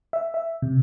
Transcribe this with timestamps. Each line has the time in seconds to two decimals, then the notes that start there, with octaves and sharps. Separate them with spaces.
0.13 E5
0.34 E5
0.62 C3